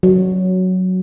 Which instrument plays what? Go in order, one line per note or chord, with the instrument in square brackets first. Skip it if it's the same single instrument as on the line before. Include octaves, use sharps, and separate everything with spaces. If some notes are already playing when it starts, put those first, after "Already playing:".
[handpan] F#3